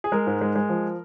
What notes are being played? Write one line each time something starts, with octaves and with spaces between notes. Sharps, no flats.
G#4
G#3 A#4
G#2
G#3
G#3
F3